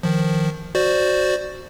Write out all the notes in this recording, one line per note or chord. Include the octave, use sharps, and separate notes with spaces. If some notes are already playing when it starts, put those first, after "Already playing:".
D#3 F3
F#4 C5 D5